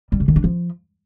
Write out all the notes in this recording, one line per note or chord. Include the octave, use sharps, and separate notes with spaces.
G3
C#3
D#3
D4
F3